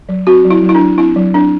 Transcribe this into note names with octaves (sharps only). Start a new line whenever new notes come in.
F#3
C4 F#4
F#3
E4
F#3
E4
D4
F#3
C4 E4
F#3
C4 D4